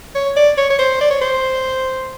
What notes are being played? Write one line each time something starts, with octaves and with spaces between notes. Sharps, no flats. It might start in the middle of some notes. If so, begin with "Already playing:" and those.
C#5
D5
C#5
C#5
C5
D5
C#5
C5